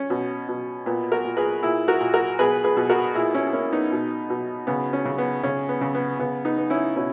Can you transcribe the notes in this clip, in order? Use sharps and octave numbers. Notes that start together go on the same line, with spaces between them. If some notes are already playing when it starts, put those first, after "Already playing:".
Already playing: C#4
B2
B2
A#2 B3
F#4 A#4
A#2
G#4 B4
A#2 E4 G#4
F#4 A#4
A#2
F#4 A#4
B2 G#4 B4
G#4 B4
B2
F#4 A#4
A#2 E4 G#4
C#4 E4
A#3 C#4 E4
B3 D#4
B2
B2
C#3 B3
C#4
C#3
B3
C#3 C#4
B3
C#3
B3
C#3 B3
B3 D#4
B3
C#4 E4
B2 C#4 E4